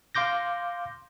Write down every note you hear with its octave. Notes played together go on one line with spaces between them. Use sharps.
F5 C6 D6 G6 A#6